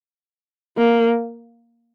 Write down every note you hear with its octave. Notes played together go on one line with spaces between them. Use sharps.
A#3